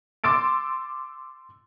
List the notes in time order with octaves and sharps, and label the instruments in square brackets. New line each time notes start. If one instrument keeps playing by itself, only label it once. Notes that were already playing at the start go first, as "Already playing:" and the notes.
[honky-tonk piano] C6 D6 E6 A6 D7